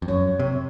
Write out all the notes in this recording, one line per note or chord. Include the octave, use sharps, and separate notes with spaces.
F2
F#2 C#5
C3